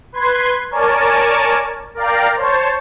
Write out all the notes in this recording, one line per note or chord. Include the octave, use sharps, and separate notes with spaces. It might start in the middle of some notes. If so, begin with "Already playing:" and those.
B4 C6 G#6
A#4 C#5 D5 G#5 A5
A#4 D5 F5 G5 A#5
C5 C#5 A5